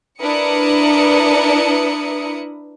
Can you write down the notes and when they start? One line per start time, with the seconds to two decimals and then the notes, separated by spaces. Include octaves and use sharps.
0.22 D4 E4 A#4 B4 D#6 C#7